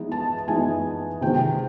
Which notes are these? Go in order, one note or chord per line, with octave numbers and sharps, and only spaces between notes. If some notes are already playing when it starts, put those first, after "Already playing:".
Already playing: E3 G#3 B3 D#4
A5
E3 G#3 B3 D#4 G#5
C3 D#3 G#3 G5